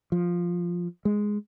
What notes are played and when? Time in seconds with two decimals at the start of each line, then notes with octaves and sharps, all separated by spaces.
0.12 F3
1.05 G#3